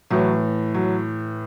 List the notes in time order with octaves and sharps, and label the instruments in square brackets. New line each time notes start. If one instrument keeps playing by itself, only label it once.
[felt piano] A2 E3 F#3
F#3